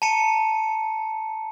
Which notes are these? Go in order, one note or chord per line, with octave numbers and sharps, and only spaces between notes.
A5 A#5 C#7 D#7